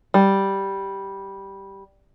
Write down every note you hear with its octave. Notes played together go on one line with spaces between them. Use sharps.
G3